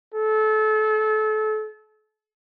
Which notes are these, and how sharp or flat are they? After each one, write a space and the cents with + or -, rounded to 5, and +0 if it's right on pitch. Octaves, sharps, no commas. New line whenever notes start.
A4 -30